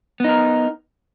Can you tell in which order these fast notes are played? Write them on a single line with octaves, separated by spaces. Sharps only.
B3 D#4 A#4